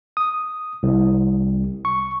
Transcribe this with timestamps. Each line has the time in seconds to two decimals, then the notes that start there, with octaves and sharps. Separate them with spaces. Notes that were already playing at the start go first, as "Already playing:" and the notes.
0.17 D#6
0.83 C2
1.85 C#6